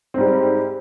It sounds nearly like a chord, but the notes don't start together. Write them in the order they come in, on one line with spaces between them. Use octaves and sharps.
C4 G#2 G3